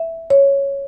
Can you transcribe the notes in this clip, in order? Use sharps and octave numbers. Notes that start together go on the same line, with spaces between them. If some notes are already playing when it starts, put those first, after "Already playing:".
Already playing: E5
C#5